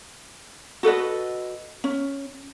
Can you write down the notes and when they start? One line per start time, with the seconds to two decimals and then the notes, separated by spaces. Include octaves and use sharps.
0.83 F#4 A4 B4 D#5
1.84 C#4